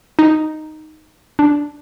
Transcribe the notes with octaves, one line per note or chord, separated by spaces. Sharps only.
D#4
D4